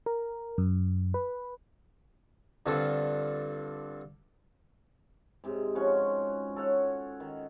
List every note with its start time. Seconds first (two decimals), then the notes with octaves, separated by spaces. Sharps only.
0.06 A#4
0.58 F#2
1.14 B4
2.66 G2 D3 C4 F4 A4
5.44 G#2 C3
5.75 F3 C#4 F#4 C#6
6.56 A4 C#5 F#5
7.20 D#3